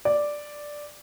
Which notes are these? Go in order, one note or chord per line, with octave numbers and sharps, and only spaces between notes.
D5